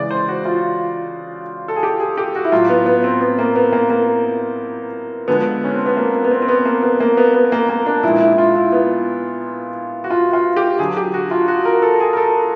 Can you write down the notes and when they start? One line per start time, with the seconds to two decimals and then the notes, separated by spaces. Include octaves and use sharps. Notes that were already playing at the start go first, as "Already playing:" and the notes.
Already playing: C#3 E3 G#3 D5
0.11 C5
0.28 F#4
0.45 F4
1.68 A4
1.76 G#4
1.83 G4
2.00 G#4
2.17 G4
2.35 F#4
2.44 E4
2.52 A2 F#3 F4
2.69 B3
2.86 B3
3.04 C4
3.21 B3
3.39 A#3
3.56 B3
3.72 A#3
3.90 A#3
5.28 D3 F3 G#3 B3
5.64 C#4
5.75 C4
5.86 B3
5.97 A#3
6.24 B3
6.31 C4
6.42 C4
6.48 B3
6.65 A#3
6.83 B3
7.00 A#3
7.17 B3
7.34 B3
7.52 A#3
7.69 A#3
7.86 D4
8.03 A#2 F3 G#3 E4
8.21 E4
8.33 E4
8.38 F4
8.55 E4
8.72 B3
10.04 F#4
10.10 F4
10.33 F4
10.57 G4
10.79 D3 F#3 G#4
10.97 G4
11.14 F#4
11.31 F4
11.48 F#4
11.65 A#4
11.82 A4
12.00 G#4
12.13 A#4
12.17 A4